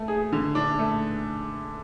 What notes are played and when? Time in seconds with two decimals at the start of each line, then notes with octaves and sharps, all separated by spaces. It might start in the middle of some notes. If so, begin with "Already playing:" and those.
Already playing: A3
0.08 G#4
0.33 D3
0.55 D4
0.79 A3